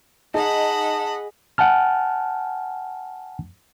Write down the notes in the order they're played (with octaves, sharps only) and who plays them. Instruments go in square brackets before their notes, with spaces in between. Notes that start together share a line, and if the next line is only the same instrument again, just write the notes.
[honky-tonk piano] D#4 [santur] G#4 [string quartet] D#5 F#5 B5 [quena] A5
[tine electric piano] F#5 G#5 A5 F6